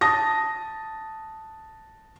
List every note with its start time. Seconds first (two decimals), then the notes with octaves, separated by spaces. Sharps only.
0.01 A5 D#6 A#6